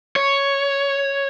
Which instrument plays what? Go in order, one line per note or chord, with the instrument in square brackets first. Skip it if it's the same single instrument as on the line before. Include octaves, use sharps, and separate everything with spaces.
[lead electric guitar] C#5